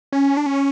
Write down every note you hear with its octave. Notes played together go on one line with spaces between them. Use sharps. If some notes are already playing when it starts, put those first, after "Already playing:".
C#4
D4
C#4